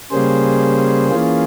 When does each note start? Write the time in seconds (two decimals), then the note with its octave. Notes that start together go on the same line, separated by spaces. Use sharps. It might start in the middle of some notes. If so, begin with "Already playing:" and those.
0.11 C#3 G3 A#3 C#4 G#4 C5
1.10 E3 A#3 C#4 F4 G#4